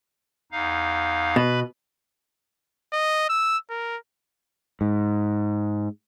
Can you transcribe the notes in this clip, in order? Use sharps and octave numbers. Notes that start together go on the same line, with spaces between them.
E2 D#4 F5
B2 B4 B5
D#5
E6
A#4
G#2